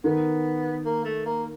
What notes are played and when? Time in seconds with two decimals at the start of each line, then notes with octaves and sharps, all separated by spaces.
0.04 D#3 B3
0.85 A#3
1.05 A3
1.25 A#3